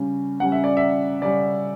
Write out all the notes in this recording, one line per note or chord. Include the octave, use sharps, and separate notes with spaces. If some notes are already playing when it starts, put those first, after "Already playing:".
Already playing: C#3 G3 C#4
C#3 G3 C#4 F#5
E5
D5
E5
C#3 G3 C#4 D5